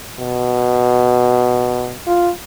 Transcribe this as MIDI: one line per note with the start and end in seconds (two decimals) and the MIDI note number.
0.19 1.94 47
2.07 2.30 65